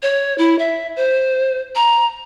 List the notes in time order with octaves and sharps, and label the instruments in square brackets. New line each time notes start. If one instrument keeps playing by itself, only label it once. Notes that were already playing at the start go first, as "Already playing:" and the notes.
[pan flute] C#5
E4
E5
C5
A#5